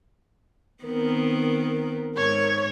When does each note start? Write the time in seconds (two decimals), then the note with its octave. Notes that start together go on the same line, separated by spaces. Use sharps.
0.84 D#3 B3 C4 A#4
2.16 G#2 C#5